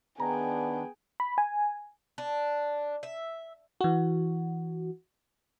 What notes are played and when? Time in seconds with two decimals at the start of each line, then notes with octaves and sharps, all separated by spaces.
0.20 D#3 B3 D4 G#4 G5 A#5
1.20 B5
1.38 G#5
2.18 D4
3.03 E5
3.81 E3 F#4